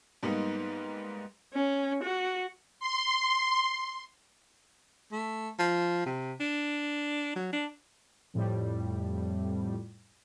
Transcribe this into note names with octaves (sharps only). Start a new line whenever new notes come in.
G#2 G3 A#3 B3 D#4
C#4
F#4
C6
A3
F3
C3
D4
F#3
D4
F2 A2 G3